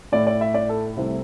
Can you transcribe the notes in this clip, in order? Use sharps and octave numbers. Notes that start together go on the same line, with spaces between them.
A2 A3 E4 D5
D5
E5
D5
A4
C2 C3 A3 E4 C5